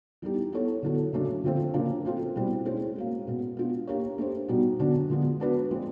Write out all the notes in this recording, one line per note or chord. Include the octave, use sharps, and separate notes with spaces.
E3 G3 B3 D#4 G4
B3 E4 A4 C#5
D3 F#3 B3 E4 A4
C#3 F#3 A3 D4
D3 F3 A3 C4 F4
C#3 F3 A#3 D4
A3 C4 F4 A4
B2 G3 C4 E4
G#3 C#4 E4 G#4 C5
A#3 C#4 F#4
B2 G#3 B3
B3 D4 F4
A#3 D4 G4 A#4 C#5
A3 D4 G4 C5
B2 G3 B3 D#4 F#4
D3 F#3 B3 D4 F#4
D3 F3 G#3 B3
B3 D4 F#4 B4
F3 G#3 C4